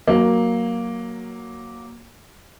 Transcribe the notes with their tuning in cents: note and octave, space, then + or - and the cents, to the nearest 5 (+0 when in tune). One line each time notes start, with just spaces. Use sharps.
F#3 +0 A#3 +0